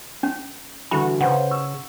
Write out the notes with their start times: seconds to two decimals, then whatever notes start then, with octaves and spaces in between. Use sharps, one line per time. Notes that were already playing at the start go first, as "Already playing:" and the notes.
0.23 C#4
0.91 D3 E3 G3 F#4 B5
1.21 C#3 B4 C5 F#5 G5
1.51 C#6 E6